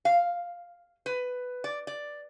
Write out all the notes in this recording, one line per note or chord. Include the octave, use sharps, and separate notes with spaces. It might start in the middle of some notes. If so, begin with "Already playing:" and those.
F5
B4
D5
D5